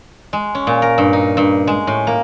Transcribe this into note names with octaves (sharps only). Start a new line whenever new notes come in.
G#3
C#4
A#2
A#4
G2
D#4
G2
G#3
A2
A#3